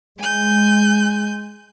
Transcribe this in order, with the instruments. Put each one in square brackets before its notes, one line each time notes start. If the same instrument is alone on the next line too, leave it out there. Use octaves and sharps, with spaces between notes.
[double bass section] G#3 [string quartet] G#5 G6